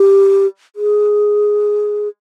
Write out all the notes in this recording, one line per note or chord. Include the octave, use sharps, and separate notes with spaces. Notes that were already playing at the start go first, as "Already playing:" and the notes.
Already playing: G4
G#4